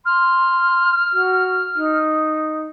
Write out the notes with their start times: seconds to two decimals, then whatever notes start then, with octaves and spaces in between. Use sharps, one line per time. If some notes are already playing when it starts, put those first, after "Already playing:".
0.06 C6 F6
1.13 F#4
1.75 D#4